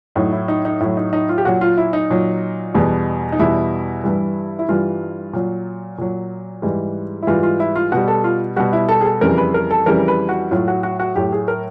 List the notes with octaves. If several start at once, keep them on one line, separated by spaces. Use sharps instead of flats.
A2 F#3 D#4
E4
D#4
D#4
A2 F#3 E4
D#4
D#4
F4
G4
A#2 F#3 F#4
F4
E4
D#4
A#2 F#3
E2 B2 G3
D#4
E2 B2 G3 E4
G2 E3 G3
E4
G2 E3 G3 F4
A#2 F#3
A#2 F#3
G#2 E3 G3
E4
G#2 E3 G3 F4
F4
E4
F4
B2 G3 F#4
A4
F4
B2 G3 F#4
E4
A4
G#4
A4
F2 C#3 E3 G3 A#4
B4
A#4
A4
F2 C#3 E3 G3 A#4
B4
F#4
A2 F#3 F4
F#4
F#4
F#4
A2 F#3 G4
G#4
A#4